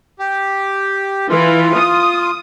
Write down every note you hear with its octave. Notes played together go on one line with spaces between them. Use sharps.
G4
E3 F4
D#6